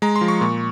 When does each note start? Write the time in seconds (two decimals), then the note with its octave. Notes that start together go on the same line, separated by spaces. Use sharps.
0.02 G#3 A#5
0.16 C6
0.21 F3
0.28 C#6
0.41 A#2